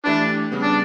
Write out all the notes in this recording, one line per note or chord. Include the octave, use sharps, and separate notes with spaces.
E3 A3 D4 E4 G4 B4
C#3 G3 B3
D4